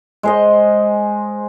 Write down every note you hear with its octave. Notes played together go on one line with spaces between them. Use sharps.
G#3 C5 D#5